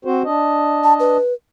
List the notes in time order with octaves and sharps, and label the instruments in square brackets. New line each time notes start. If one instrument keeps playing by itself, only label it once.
[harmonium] C4 F#4 C5
D4 D#5
[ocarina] A5
B4